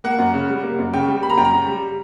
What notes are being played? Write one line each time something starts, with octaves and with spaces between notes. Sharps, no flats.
A#3 F#5
F#2
C#3
G3
A#3
F#2
C#3 G5
G3 G5
A#3 B5
A#5
F#2 G5
A#5
C#3
G3